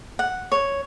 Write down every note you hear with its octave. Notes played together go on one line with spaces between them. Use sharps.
F#5
C#5